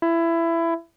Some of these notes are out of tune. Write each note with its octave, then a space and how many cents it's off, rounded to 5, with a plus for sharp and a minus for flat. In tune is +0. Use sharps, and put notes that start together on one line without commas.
E4 +20